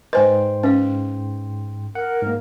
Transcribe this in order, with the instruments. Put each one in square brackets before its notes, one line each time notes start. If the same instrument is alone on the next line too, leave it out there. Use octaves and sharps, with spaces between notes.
[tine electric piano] G#2 G5 C6 [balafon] B4 G#5 [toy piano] C5 D#5
[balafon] C#4 [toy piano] B4 F5
[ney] A#4 [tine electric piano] F#5
[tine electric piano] G#2 A#3